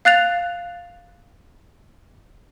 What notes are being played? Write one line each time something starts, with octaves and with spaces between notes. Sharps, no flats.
F5 F#6 A6 F7